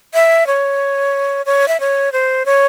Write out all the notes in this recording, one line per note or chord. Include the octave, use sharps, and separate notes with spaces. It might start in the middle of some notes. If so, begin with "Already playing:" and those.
E5
C#5
C#5
E5
C#5
C5
C#5